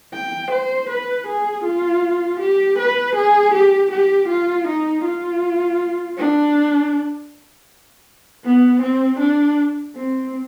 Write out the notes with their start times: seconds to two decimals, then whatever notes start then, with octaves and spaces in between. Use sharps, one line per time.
0.14 G5
0.51 C5
0.89 B4
1.27 G#4
1.64 F4
2.40 G4
2.78 B4
3.16 G#4
3.54 G4
3.91 G4
4.28 F4
4.67 D#4
5.04 F4
6.18 D4
8.44 B3
8.82 C4
9.20 D4
9.96 C4